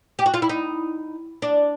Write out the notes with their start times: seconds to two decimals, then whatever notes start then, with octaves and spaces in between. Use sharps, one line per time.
0.19 G4
0.26 F#4
0.34 F4
0.42 E4
0.49 D#4
1.42 D4